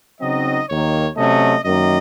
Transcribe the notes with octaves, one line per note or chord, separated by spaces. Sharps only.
C#3 F#3 C4 D#4 D#5
D#2 D#3 A#3 C#5
C3 F#3 A3 C#4 D#5
F#2 D#3 A#3 D#5